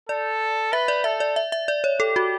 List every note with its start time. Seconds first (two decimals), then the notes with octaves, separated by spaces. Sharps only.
0.09 A4 D5
0.72 B4 E5
0.88 D5
1.04 A4 E5
1.20 D5
1.36 E5
1.52 E5
1.68 D5
1.84 C#5
2.00 G4 A4
2.16 F#4